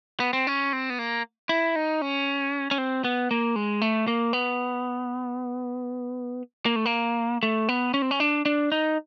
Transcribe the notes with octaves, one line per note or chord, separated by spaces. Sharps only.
B3
C4
C#4
C4
B3
A#3
E4
D#4
C#4
C#4
C4
B3
A#3
G#3
A3
A#3
B3
A#3
A3
A#3
A3
B3
C#4
C4
C#4
D4
D4
D#4